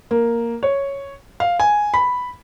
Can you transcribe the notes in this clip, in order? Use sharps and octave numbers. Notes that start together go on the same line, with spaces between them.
A#3
C#5
F5
G#5
B5